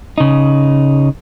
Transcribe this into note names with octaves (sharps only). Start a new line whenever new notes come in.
C#3 D#4